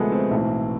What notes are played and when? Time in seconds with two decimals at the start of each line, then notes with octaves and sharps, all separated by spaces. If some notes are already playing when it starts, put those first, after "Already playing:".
Already playing: D2 C3 F3 G#3 A3 B3
0.12 C4
0.31 B1 A2 E3